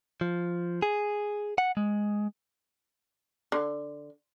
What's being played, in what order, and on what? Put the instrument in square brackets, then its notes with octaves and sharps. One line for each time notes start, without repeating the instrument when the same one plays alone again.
[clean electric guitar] F3
G#4
F#5
G#3
[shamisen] D3